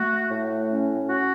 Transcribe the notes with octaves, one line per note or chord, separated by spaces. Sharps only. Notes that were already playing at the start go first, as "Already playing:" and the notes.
Already playing: A3 F#4
A2
C#4
F#4